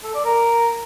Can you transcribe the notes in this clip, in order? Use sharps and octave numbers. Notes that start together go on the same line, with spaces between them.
A4
D5
A#4